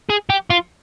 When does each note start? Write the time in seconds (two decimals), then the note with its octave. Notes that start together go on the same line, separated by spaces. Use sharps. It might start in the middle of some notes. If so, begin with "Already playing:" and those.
0.09 G#4
0.30 G4
0.50 F4